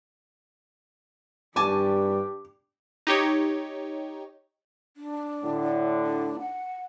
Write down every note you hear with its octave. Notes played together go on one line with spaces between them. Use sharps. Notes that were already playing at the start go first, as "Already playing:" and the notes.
G2 D4 G4 G#5 A5 C#6 D6
D#4 G4 C#5
D4
A2 D3
D4
F#5